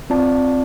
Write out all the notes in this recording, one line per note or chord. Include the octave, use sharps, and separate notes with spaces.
C4 F4 D5 A5